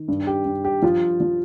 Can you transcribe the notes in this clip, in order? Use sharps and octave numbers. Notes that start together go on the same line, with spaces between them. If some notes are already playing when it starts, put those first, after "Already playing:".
Already playing: D#3
G2
G4
G2
G4
F3 F4
F3